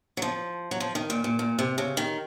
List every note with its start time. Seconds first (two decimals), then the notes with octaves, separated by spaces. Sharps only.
0.17 F#3
0.22 F3
0.71 F#3
0.80 F3
0.95 D#3
1.10 A#2
1.24 A#2
1.39 A#2
1.59 C3
1.78 C#3
1.97 D#3